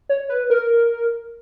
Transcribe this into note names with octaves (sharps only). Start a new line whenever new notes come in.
C#5
B4
A#4